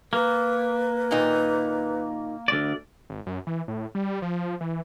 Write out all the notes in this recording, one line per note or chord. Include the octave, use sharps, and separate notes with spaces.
A#3 B4
A#2 D#3 D#4
D2 D5
G#1
F#2
E3
A2
G3
F3
E3